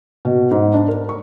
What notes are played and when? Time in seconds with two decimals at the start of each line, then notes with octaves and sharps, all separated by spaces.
0.25 B2
0.51 G#2
0.74 D4
0.88 A#4
1.09 C#6